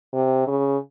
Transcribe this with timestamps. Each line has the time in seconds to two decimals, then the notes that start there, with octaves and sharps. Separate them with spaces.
0.13 C3
0.47 C#3